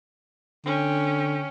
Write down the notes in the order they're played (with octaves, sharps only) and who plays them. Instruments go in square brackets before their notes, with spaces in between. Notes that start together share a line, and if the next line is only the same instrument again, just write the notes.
[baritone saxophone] D3 [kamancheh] C#4 G5